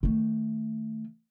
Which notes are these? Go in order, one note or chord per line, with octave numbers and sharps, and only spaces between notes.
D#3 A3